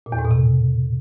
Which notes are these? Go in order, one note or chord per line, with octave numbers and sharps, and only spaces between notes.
A#2
E2
A2
B2
C3